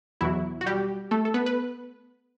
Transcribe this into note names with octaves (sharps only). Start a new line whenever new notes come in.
E2 B2 F#3 E4
F#4
G3 G4
A3 A4
A4
B3 B4
B4